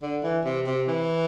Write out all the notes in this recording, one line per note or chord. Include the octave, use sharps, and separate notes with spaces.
D3
E3
C3
C3
E3